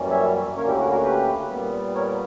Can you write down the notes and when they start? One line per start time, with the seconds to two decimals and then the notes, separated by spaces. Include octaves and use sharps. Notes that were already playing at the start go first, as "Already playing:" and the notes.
Already playing: F#2 E3 G3 A#3 C#4
0.10 C#5 E5
0.57 D2 D3 A#3 C#4 A#4 C#5
0.68 E4 G4
0.80 F#4 A#4
0.91 F#4 A#4
1.03 G4 B4
1.49 A#2 G3 B3
1.95 A#4 C#5